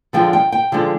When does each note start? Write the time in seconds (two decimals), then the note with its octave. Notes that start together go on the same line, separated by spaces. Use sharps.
0.13 D3 F3 G#3 D4 G5
0.33 G5
0.52 G5
0.72 D3 F3 G#3 D4